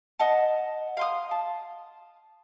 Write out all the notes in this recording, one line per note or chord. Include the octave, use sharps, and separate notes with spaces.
D#5 F#5 A5
F5 C6 D#6
A5